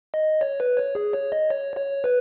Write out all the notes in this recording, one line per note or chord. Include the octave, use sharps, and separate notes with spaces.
D#5
C#5
B4
C#5
G#4
C#5
D#5
C#5
C#5
B4